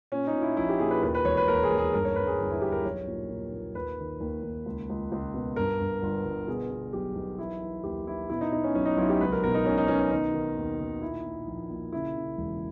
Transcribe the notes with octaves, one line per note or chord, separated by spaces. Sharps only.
A#2 C#4
D#4
A#2
E4
A#1 E4
G4
A#2 G#4
B4
D#2 B4
B4
E1 C#5
B4
D#2 A#4
G#4
D#2
G#4
G2 A#4
C#5
G2 B4
G#4
G1
E4
G1 G4
A#4
B1 C#5
A#2
A#2
A#2
D#2 B4
D#3
D#2
D#2
C#2
C#2
C#2
B2
G2 A#4
G2
G1
G1
B2 G#4
B2
B1 G4
B1
E3 E4
E3
D#2 G4
E3 E4
B2 E4
D#4
B2 D#4
C#4
B1 C#4
D#4
B1 E4
G4
C#2 B4
A#4
B2 A#4
D#4
B2 C#4
D#4
B2 C#4
C#4
D#3 D#4
D#3
D#2
D#3
A#2 E4
A#2
A#1
A#2
C#3 E4
C#3
E1